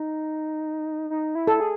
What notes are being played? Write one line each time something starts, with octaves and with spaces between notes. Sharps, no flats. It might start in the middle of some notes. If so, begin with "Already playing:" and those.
Already playing: D#4
D#4
E4
A4
G#4